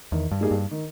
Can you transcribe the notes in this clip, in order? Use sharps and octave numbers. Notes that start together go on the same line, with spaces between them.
E2 D#3
G2
G3 A#3 D#4 G#4
G2
D#3